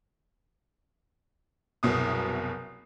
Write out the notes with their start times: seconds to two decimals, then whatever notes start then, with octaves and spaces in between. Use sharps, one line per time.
1.83 F#1 C2 B2 D#6